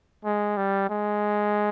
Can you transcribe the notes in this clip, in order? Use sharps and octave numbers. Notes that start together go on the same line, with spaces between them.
G#3
G3
G#3